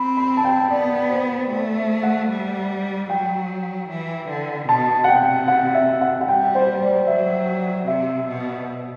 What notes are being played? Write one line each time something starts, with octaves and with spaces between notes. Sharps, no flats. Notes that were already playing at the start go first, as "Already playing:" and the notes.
Already playing: C4 B5
B5
A5
G5
B3 D5
C5
A3 C5
E5
F#5
G3
F#3 G5
E3
D3
B2 A5
F#5
C3 G5
F#5
E5
F#5
F#5
G3 G5
C5
D5
F#3 E5
C3 E5
B2